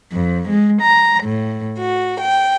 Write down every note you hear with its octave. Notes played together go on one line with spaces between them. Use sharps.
F2
G#3
A#5
A2
F#4
G5